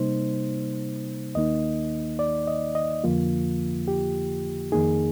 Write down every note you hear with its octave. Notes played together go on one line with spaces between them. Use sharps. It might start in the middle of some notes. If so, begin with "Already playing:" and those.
Already playing: C3 G3 A#3 D#4 C5
D#2 D#3 A#3 D#4 D#5
D5
D#5
D#5
F2 D3 F3 A#3 F4
G4
F2 D#3 A#3 D#4 G#4